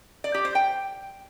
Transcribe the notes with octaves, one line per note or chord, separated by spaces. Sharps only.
D5
G4
C5
G5